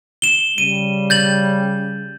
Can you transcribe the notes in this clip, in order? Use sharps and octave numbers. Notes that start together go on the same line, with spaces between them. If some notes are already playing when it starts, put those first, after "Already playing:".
E7 G7
C#3 G3 D#7
G6 A6 F#7